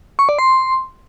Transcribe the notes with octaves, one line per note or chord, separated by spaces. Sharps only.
C#6
D5
C6